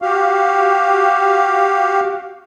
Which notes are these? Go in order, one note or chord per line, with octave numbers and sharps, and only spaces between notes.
F#4 G4 F5